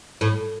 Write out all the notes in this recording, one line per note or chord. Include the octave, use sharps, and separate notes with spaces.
A2